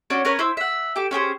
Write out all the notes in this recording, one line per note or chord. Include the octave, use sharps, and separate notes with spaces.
C#4 D4 F#4 C#5
C#4 A#4 B4 C#5
E4 C5 E6
E5 F#5
G4 A4 D6
C#4 G4 G#4 C5